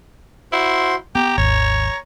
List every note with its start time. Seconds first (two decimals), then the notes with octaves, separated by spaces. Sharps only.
0.53 E4 F#4 C5 C6
1.15 B3 G4 A#5
1.38 G#1 D#2 C#5